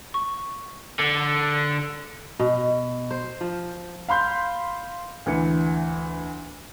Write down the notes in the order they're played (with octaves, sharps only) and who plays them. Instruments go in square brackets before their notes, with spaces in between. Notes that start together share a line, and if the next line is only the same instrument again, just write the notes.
[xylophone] C#6
[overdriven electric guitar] D3
[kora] B2
C5
F3
[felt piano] F5 B5 C6 G6
D2 E3 C#7